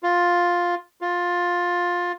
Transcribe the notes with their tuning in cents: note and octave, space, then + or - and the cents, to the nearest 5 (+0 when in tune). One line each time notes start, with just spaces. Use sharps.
F4 +10
F4 +15